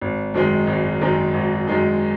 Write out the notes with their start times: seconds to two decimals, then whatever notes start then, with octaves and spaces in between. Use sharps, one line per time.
0.01 G#1
0.34 F#2 D#3 G#3 D#4
0.67 G#1
1.01 F#2 D#3 G#3 D#4
1.34 G#1
1.67 F#2 D#3 G#3 D#4